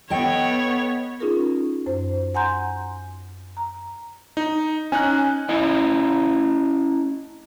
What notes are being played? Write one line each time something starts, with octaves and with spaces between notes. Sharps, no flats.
B3 A4 C#5 D#5 G5
C#4 D#4 F4 G#4 A#4
F#2 C5
F#5 G#5 A#5 C6 G6
A#5
D#4
C#4 D#4 G#5 F#6
C#4 E4 D#5